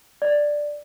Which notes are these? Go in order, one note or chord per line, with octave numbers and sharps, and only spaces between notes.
D5